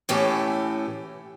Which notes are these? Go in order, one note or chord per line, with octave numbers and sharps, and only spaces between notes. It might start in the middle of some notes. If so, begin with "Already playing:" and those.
A2 E3 C#4 G4 A4